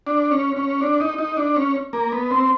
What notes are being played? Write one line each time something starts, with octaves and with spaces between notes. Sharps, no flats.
D4
C#4
C#4
D4
D#4
D#4
D4
C#4
A#3
B3
C4